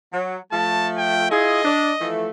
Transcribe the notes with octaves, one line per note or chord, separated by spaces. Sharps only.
F#3
F3 A3 A5
G5
E4 F4 G#4 D#5
D4
E3 F3 A3